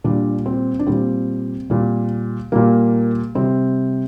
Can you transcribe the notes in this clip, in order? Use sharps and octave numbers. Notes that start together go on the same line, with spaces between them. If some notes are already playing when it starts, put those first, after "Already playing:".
A#2 G3 D4
C4
D4
A#2 G3 C4
A#2 G3
A#2 G3 A#3
C3 G3 C4